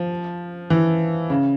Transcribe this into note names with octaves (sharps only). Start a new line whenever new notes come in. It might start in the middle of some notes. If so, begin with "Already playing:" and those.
Already playing: F3
E3
C#3